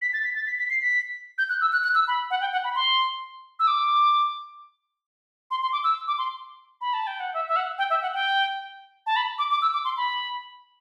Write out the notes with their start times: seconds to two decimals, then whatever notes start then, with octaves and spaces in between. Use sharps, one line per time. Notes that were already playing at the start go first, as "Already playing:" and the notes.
0.02 B6
0.13 A6
0.24 B6
0.36 A6
0.47 B6
0.59 B6
0.70 C7
0.81 B6
1.38 G6
1.49 F#6
1.61 E6
1.73 F#6
1.84 F#6
1.95 E6
2.08 B5
2.31 F#5
2.41 G5
2.52 F#5
2.64 B5
2.75 C6
3.59 E6
3.67 D6
5.51 C6
5.62 C6
5.72 D6
5.84 E6
6.08 D6
6.18 C6
6.81 B5
6.94 A5
7.07 G5
7.20 F#5
7.34 E5
7.48 E5
7.56 F#5
7.78 G5
7.90 E5
8.02 F#5
8.14 G5
9.06 A5
9.16 B5
9.39 D6
9.51 D6
9.62 E6
9.73 D6
9.85 C6
9.97 B5